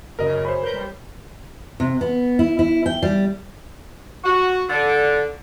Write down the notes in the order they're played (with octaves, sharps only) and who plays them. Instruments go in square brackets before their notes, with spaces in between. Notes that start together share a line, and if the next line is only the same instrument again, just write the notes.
[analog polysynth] F#2 C#3 [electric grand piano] A#4 D#5
[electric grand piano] C5 C#5 B5
[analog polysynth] A#4 B4 G6
G3
[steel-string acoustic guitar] C3
B3
E4
E4
G5
G3
[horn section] F#4
D3